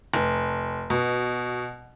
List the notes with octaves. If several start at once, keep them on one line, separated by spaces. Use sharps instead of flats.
F1
B2